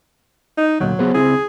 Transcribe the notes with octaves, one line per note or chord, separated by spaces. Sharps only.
D#4
D2 A#2 F#3
B3 G#4 C5
C#2 C4 E4 G#4